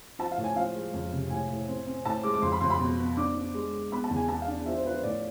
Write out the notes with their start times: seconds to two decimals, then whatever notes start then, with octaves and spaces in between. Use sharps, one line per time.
0.19 F3 A5
0.32 F5
0.38 A2
0.44 G#5
0.56 F3 F5
0.75 G#3
0.94 F2
1.13 C3
1.30 A2 G#5
1.50 A2
1.68 C4
1.87 C4
2.05 A2 A5
2.23 G#3 D6
2.34 D6
2.42 F2 C6
2.52 B5
2.61 F2 C6
2.70 B5
2.79 B2
2.99 B3
3.17 D4 D6
3.35 D4
3.54 G#3
3.73 G#3
3.92 B3 B5
4.04 A5
4.11 E2
4.16 G#5
4.29 B3 A5
4.42 F5
4.48 D4
4.66 F3 E5
4.75 C5
4.84 F3 B4
4.94 C5
5.03 A2 D5